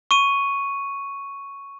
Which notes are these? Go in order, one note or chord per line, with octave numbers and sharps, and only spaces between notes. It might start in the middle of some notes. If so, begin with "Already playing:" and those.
C#6 D#7